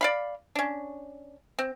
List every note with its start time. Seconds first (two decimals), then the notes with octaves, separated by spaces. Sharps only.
0.01 D5 F5 B5
0.55 C#4 D4
1.59 C4